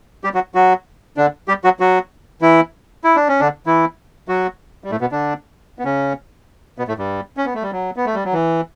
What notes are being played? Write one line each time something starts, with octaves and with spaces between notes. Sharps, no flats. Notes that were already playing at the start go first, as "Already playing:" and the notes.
G3 G4
F#3 F#4
F#3 F#4
D3 D4
G3 G4
F#3 F#4
F#3 F#4
E3 E4
E4
D4
C#4
D3 D4
E3 E4
F#3 F#4
G3
A2 A3
B2 B3
D3 D4
B3
C#3 C#4
B2 B3
A2 A3
G2 G3
C#4
B3
A3
G3
F#3
B3
A3
G3
F#3
E3